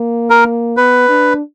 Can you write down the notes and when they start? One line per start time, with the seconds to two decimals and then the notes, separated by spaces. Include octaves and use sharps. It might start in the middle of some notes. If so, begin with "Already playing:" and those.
Already playing: A#3
0.30 A#4
0.77 B3 B4
1.09 D4